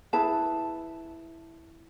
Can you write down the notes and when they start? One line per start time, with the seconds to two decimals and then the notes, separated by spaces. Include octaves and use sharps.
0.13 E4 G#4 B4 A5